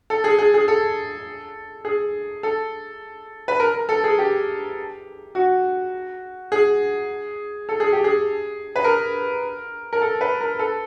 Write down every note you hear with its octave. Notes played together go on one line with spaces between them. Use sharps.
A4
G#4
G#4
G#4
A4
G#4
A4
B4
A#4
A#4
A4
G#4
G4
F#4
G#4
A4
G#4
G4
G#4
B4
A#4
A#4
A4
B4
A#4
A4